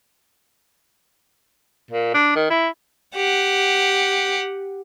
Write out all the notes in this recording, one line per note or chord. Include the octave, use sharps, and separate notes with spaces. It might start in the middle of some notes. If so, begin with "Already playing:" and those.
A#2
D4
D#3
E4
G4 F#5